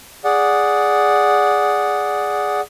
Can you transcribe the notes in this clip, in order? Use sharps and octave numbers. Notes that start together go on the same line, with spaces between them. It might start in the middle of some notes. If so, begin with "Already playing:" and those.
G#4 D5 F#5